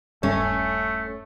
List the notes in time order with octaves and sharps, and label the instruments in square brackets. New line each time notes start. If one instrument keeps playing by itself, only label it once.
[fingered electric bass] D#1 G2 G3 [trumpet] A3 [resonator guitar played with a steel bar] C#4